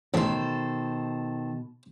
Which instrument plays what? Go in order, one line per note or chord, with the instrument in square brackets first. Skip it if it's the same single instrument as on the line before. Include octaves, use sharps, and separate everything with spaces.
[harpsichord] A1 C6 [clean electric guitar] B2 [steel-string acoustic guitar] D#3 A4 C5